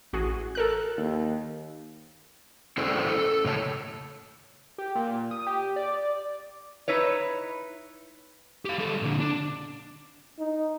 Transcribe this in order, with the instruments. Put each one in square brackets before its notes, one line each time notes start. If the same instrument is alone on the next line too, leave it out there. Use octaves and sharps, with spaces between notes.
[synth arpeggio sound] A1 F#4 G#4
A4 A#4 F#6
[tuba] D#2
[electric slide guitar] C#4 E4 A4 C5 D5
A4
A2 C#3 C#5 D5 A5
[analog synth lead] G4
A#2
D#6
G4
D5
[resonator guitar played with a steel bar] D#4 E4 B4 C#5
[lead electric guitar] G4 F5
G3 A4
A#2 D3
D4
[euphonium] D#4